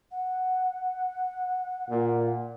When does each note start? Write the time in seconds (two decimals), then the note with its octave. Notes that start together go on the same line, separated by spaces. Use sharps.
0.11 F#5
1.90 A#2